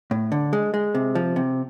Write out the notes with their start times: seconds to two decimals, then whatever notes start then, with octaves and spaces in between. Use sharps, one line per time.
0.11 A2
0.32 D3
0.53 G#3
0.74 G#3
0.95 C3
1.15 F3
1.36 C3